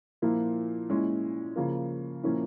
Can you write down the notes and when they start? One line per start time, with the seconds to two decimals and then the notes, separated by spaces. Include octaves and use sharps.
0.22 A#2 F3 A#3 E4
0.89 A#2 G#3 C#4 E4
1.56 C#3 F3 A#3
2.23 A#2 F3 A#3 C#4 E4